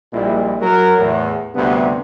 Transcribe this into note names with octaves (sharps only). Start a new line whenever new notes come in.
A#1 A#2 G3 G#3 E4
F#3 A#4
E2 A2
D2 G2 C3 B3